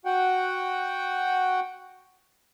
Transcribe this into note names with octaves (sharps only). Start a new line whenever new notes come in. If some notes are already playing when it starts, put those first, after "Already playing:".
F#4 F#5 G5